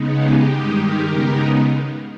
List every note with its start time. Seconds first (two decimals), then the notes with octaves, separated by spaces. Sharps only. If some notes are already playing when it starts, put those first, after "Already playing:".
Already playing: C#3 G#3 B3 D#4
0.20 G4
0.50 G2 D#3 G#3 D#4
0.81 G4 A#4
1.11 C#3 G#3 B3 D#4